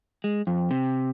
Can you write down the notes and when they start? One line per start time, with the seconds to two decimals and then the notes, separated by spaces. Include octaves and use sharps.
0.24 G#3
0.47 F2
0.71 C3